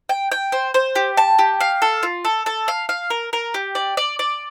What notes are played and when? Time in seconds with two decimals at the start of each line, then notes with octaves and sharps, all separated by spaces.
0.09 G5
0.32 G5
0.52 C5
0.74 C5
0.95 G4
1.17 A5
1.39 G4
1.60 F5
1.82 A4
2.03 F4
2.25 A4
2.46 A4
2.68 F5
2.89 F5
3.10 A#4
3.33 A#4
3.54 G4
3.75 D5
3.97 D5
4.19 D5